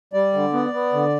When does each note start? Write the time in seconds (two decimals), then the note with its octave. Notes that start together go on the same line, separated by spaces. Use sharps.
0.13 G3 D5
0.34 D3
0.53 B3
0.73 B3
0.93 D3